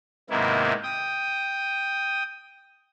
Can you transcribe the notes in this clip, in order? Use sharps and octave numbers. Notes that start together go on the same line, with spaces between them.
G#2 C3 D#3 A#3 B3 E4
G5 D#6